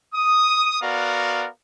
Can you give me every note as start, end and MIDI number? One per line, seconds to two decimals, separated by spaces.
0.15 0.80 87
0.82 1.47 59
0.82 1.47 66
0.82 1.47 70
0.82 1.47 74
0.82 1.47 77